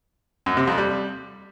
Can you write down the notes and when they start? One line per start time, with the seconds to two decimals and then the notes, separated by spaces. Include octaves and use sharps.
0.46 F#2
0.57 C3
0.67 F2
0.78 G3